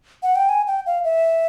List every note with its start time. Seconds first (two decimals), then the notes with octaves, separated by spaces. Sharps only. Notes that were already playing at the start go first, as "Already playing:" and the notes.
0.23 F#5
0.36 G5
0.49 G#5
0.67 G5
0.86 F5
1.04 E5